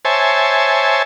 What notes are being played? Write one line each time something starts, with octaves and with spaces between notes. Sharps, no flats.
C5 C#5 E5 G#5 A5